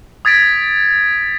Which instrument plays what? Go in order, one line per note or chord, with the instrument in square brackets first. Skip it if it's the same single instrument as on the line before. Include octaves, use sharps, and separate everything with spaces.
[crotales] D#6 G#6 A6 B6 D7